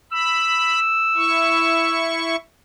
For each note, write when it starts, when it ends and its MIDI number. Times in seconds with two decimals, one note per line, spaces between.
0.12 0.80 83
0.12 2.15 88
1.16 2.36 64
1.16 2.36 85